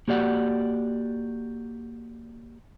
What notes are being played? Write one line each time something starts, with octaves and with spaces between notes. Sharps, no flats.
A#3 F#4 G4 D5 F#5